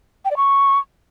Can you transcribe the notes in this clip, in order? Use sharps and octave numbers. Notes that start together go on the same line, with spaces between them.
G5
D5
C#6